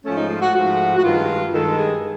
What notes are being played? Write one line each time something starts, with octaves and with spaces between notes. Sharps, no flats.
G#2 F3 A3 C#4
D#4
F4
F#4
G#2 F3 A3 F#4
F#4
G2 D#3 G#3 F4
G2 D#3 G#3 A4
G#4